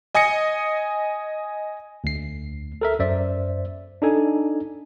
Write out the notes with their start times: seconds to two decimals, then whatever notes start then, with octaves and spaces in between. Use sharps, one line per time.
0.15 D#5 G#5 D#6 A#6 C#7
2.04 D2 C7
2.81 A4 A#4 E5
2.99 F#2 C5 D5 E5
4.02 D4 D#4 A4 G#5